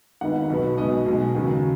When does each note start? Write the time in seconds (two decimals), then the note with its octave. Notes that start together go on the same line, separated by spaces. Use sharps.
0.21 G#1 G#2 D#3 B3 F#5
0.50 B1 B2 B3
0.78 B1 B2 G#3 B3 D#5
1.06 B1 B2 G#3
1.35 D#2 C#3 F#3